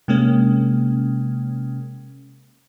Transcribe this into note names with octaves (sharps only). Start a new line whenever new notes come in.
C3 G#3 A#3 C#4